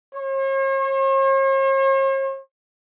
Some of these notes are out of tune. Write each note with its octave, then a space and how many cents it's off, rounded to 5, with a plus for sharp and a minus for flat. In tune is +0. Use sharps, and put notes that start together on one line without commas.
C#5 -45